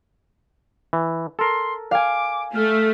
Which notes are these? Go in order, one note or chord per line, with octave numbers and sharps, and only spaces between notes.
E3
A4 A#4 C6
F5 G#5 D6
A3 F6